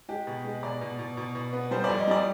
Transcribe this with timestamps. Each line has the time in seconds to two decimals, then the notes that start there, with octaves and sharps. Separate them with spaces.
0.08 G#3 G4
0.27 B2
0.44 G#3
0.63 B2 D5
0.81 B2
0.99 B2
1.17 B2
1.35 B2
1.53 B3
1.71 G3 C5
1.84 F2 D5
1.98 D#5
2.07 G3 D5